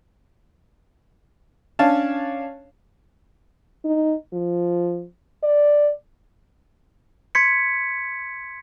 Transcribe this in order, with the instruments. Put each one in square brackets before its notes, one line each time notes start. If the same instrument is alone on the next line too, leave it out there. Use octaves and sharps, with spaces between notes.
[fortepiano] C#4 D4 C#5 F5 A5
[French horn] D#4
F3
D5
[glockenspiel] C6 G#6 B6 C#7